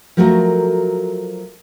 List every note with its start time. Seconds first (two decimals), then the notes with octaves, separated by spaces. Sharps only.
0.17 F3 F#3 A3 F#4 A4 A#4